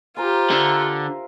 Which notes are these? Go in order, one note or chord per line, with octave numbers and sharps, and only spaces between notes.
F4 G4 A#4 C5 G#5
D3 A#4 E5 F5